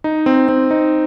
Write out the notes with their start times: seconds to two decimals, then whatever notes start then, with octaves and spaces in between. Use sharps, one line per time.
0.04 D#4
0.26 C4
0.49 C4
0.71 D#4